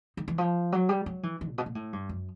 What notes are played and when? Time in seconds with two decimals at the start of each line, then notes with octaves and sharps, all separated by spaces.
0.17 D#3
0.28 E3
0.38 F3
0.72 F#3
0.89 G3
1.06 F#3
1.23 E3
1.41 E3
1.50 A#2
1.58 B2
1.66 A#2
1.75 A2
1.93 G2
2.09 F#2